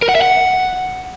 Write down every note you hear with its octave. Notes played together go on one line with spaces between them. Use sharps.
A#4
F#5
E5
F#5